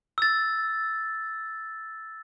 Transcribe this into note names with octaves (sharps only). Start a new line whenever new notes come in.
E6 A6